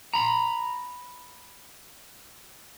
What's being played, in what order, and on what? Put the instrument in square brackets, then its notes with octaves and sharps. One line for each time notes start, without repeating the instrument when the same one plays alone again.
[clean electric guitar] A#5 B5